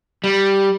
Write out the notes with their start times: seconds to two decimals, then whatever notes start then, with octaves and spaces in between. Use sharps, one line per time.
0.24 G3